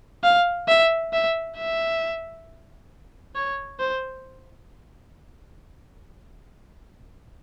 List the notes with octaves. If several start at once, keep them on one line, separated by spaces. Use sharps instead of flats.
F5
E5
E5
E5
C#5
C5